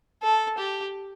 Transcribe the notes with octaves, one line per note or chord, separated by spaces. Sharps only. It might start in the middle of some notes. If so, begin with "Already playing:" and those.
A4
G4